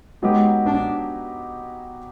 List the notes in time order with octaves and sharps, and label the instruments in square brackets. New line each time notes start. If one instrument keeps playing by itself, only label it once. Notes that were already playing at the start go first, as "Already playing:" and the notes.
[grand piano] F#3 B3 D#4 G4 [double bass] G#3
[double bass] D4